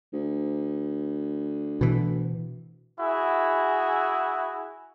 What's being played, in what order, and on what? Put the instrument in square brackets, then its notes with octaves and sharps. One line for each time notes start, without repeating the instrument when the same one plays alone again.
[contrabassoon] D2
[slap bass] B2 E3
[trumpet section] E4 F#4 G#4